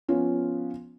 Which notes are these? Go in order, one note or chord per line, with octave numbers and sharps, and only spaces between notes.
F3 B3 C#4 F4